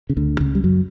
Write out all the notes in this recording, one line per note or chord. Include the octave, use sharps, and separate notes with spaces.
C#3
D2 D3
C#2 C#3
G3
F#2 F#3